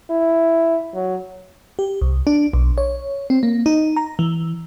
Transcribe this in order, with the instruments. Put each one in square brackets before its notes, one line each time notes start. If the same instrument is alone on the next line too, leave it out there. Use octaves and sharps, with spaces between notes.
[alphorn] E4
F#3
[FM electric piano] G4
C2
D4
B1
C#5
C4
A#3
D#4
A#5
E3